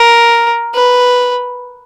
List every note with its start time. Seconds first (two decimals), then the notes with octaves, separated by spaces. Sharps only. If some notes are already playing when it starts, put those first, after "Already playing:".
Already playing: A#4
0.74 B4